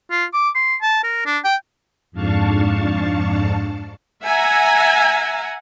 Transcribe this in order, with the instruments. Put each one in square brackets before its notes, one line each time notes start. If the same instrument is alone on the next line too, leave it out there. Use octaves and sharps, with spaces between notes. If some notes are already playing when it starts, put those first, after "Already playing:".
[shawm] F4
D6
C6
A5
A#4
D4
G5
[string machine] F2 G#2 D4 F5 A5 C#6
[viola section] E5 F#5 G#5 A#5